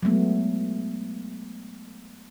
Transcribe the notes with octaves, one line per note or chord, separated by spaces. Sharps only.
F#3 G#3 A3 B3